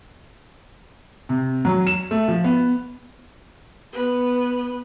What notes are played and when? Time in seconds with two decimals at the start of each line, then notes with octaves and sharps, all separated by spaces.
1.29 C3
1.65 F#3
1.87 E7
2.11 A3
2.28 F3
2.44 B3
3.93 B3 B4